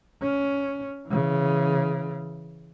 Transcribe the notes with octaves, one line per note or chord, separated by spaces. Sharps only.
C#4
C#3 E3